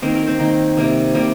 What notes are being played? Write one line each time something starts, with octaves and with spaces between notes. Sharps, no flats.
D#3 A#3 C4 C5
A#3 A#4
C4 C5
D#3 A#3
C3 G3 A#3
C3 G3 A#3